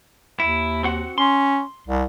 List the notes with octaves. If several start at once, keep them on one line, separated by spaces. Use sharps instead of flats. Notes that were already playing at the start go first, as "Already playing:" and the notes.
D#2 E4
C4 F#4 F#5
C#4 C6
C2